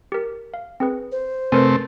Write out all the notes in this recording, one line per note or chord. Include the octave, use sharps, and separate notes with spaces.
G4 A#4
F5
C4 G#4 B4
C5
C3 A3 C4 A#4 B4 G#5